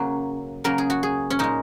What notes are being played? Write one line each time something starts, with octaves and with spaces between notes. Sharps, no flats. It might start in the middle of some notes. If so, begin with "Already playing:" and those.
Already playing: C#3 F#3 A#3 F#4
C#3 F#3 A#3 A#4
G#4
F#4
G#4
C#4
A#2 G#3 D#4